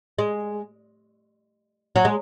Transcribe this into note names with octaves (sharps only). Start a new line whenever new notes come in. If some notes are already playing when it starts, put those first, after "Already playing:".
G#3
F#3
G#3